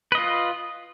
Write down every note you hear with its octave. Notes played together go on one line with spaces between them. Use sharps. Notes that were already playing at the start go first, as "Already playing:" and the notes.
F4 B4 D#5